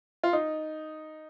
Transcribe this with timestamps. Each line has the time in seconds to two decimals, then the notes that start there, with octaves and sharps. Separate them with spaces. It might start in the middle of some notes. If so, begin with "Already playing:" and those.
0.23 F4
0.33 D#4